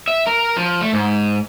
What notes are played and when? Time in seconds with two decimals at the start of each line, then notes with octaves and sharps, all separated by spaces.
0.08 E5
0.27 A#4
0.57 F3
0.81 A3
0.93 G#2